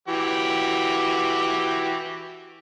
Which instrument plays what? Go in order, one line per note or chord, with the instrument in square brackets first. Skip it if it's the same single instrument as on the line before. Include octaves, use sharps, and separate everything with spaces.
[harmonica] E3 F#4 G4